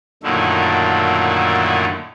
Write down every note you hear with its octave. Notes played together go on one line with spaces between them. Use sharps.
F#2 A#2 D3 D#3 A3 E4